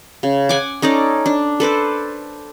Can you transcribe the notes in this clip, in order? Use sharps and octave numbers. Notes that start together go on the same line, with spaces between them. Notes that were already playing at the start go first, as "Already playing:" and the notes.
C#3
F#5 G#5 D6
C#4 D#4 A4 D5
D4
A4 B4 C5 D5